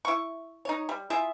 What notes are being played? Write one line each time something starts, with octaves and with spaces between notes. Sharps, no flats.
E4 C#6
D#4 C#5
G3
E4 F4 G#4 E5